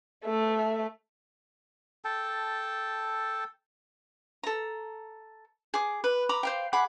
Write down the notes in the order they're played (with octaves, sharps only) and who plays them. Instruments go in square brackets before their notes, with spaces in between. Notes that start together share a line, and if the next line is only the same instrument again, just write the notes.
[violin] A3 E5
[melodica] A4 G5 A5
[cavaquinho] A4 A#5
G#4 D6
B4
A#5 B5 D6
C5 F5 G5
G#4 F#5 B5 D6